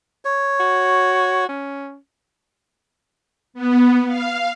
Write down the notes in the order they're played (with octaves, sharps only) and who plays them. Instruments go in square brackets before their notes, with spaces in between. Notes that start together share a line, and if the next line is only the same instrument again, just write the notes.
[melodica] C#5
[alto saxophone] F#4
C#4
[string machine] B3
F5